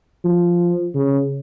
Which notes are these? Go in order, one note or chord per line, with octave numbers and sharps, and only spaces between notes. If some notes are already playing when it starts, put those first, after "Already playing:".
F3
C#3